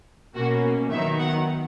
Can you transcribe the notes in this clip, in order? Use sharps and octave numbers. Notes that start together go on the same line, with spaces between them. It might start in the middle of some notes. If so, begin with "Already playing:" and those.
B2 A#3 C#4 F#4
D#3 F#3 B3 D#4 E5
F#5